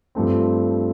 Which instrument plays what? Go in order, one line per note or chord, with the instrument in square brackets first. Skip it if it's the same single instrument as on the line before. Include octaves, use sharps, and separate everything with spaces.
[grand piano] G2 F3 A3 C4